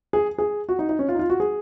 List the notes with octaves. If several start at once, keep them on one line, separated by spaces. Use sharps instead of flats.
G#4
G#4
F#4
D#4
D#4
C#4
F4
D#4
F4
F#4
G#4